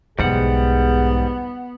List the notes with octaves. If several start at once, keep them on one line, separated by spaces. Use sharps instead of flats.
B1 E2 G#2 G3 B3 G#4 F#5